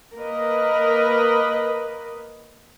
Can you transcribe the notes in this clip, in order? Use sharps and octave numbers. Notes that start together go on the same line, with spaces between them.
A#3 A#4 B4 D#5